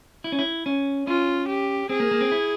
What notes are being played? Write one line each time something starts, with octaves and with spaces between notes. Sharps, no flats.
E4
C#4
E4
C#4
C#4 F4
G4
C4 G#4
A#3
A#3
C4
E4